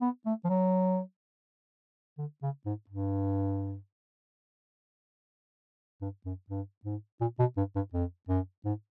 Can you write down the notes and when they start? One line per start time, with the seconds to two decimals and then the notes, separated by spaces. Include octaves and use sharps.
0.02 B3
0.26 A3
0.45 F3
0.49 F#3
2.18 D3
2.42 C#3
2.66 G#2
2.90 G2
6.01 G2
6.26 F#2
6.50 G2
6.85 G#2
7.21 A#2
7.39 B2
7.57 G2
7.76 G2
7.93 F2
8.29 F#2
8.65 G#2